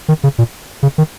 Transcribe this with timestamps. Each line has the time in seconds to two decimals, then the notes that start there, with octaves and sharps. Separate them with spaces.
0.08 D#3
0.24 C#3
0.38 A#2
0.83 C#3
0.98 D#3